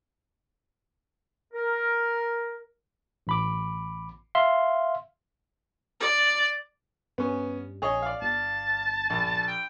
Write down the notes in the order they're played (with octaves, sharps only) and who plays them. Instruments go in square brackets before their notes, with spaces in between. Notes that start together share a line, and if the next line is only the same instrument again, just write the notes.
[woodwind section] A#4
[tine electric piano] A1 B5 D6
E5 F5 C6
[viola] D5
[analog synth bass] G2 [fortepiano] B3 C#4
[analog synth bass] A#1 [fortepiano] G#4 C#5 D#5
[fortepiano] D5 F5
[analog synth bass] G1 [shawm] A5
[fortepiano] A#1
[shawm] G5